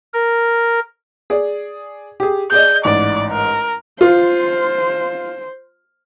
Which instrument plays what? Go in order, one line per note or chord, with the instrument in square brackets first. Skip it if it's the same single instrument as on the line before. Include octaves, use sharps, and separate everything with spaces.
[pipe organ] A#4
[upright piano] G#4 D5
G4 G#4
[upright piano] G#4 D5 D#5 [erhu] G6
[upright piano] A1 G#2 [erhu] D5
[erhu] A#4
[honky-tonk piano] F4 [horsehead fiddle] C5